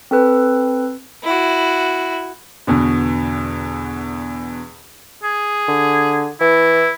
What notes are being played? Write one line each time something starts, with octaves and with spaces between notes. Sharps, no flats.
C4 A4 B4
E4 F#4
E2 B2 D3
G#4
D3
E3 E4